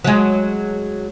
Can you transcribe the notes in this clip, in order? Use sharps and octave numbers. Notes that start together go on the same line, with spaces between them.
F#3 G#3